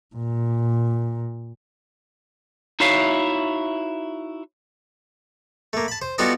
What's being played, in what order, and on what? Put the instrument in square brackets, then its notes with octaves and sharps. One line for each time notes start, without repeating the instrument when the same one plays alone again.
[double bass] A#2
[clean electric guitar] D#4 E4 F#4 C#5 E5 F5
[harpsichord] A3 A#3
A5 B5
C5
G3 B3 F4 F#4 A4 D#5